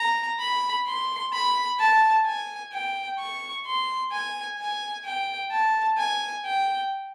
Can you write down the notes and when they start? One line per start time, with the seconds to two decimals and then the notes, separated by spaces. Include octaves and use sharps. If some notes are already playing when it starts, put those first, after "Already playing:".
Already playing: A#5
0.40 B5
0.86 C6
1.33 B5
1.80 A5
2.26 G#5
2.73 G5
3.19 C#6
3.66 C6
4.12 G#5
4.59 G#5
5.05 G5
5.51 A5
5.98 G#5
6.45 G5